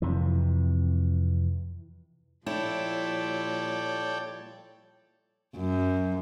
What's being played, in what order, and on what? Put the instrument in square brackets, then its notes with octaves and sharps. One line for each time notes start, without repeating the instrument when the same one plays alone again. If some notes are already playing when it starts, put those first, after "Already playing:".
[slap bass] F2 C3 E3
[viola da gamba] A#2 F3 G3 [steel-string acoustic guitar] E4 [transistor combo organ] A4 D5 G5 [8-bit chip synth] C#5
[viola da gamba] F#2